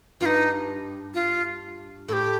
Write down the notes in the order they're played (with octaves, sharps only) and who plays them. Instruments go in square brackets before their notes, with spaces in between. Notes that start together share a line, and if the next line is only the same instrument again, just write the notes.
[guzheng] G2 [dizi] F4
[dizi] D#4
F4
[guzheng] A2 [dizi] A4
[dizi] G4